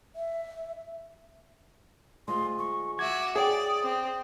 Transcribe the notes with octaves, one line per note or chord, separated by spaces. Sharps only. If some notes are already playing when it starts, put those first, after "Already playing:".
E5
D2 G#3 F4 C6
C#6
F#4 E5 D6 G#6
G#4 C#5 D5 G5 D#6
C4